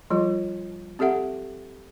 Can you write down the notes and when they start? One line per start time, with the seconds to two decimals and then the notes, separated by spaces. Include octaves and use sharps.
0.10 F3 G3 F4
0.99 C4 G4 A4 E5 F#5